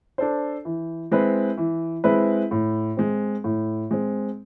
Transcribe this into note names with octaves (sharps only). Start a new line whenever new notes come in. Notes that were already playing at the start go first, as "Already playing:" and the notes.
D4 A4 C5
E3
G#3 C4 E4 B4
E3
G#3 C4 E4 B4
A2
G#3 C4
A2
G#3 C4